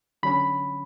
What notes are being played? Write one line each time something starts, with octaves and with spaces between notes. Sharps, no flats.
D3 F#3 C#4 B5